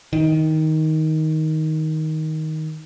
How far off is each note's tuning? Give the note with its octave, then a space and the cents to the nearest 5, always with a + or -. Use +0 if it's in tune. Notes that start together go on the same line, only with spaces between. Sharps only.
D#3 +10